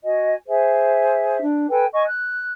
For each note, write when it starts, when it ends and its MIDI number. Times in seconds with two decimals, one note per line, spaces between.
0.04 0.34 66
0.04 0.34 75
0.04 0.34 80
0.47 1.41 68
0.47 1.41 72
0.47 1.41 76
1.41 1.66 62
1.69 1.85 69
1.69 1.85 71
1.69 1.85 79
1.69 1.85 80
1.92 2.06 75
1.92 2.06 80
1.92 2.06 85
2.06 2.52 90